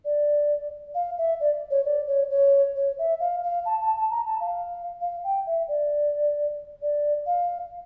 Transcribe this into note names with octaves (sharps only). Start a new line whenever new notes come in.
D5
F5
E5
D5
C#5
D5
C#5
C#5
C#5
E5
F5
F5
A5
A5
A5
A#5
A5
F5
F5
G5
E5
D5
D5
F5